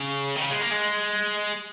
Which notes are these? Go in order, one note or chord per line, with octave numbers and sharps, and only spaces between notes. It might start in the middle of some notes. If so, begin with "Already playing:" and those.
Already playing: C#3
D#3
C#3
G#3
A#3
G#3